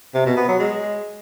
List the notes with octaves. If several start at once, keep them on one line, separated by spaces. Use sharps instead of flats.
C3
B2
B3
F#3
G#3